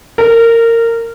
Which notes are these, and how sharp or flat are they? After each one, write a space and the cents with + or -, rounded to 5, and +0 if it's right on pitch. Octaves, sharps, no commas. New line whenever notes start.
A#4 -20